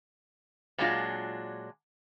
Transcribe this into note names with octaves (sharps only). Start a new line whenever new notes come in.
A#2 F#3 G#3 D4 F4